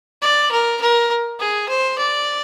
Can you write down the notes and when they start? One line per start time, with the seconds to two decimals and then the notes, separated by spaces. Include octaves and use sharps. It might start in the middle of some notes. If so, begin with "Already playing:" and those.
0.22 D5
0.51 A#4
0.81 A#4
1.40 G#4
1.69 C5
1.98 D5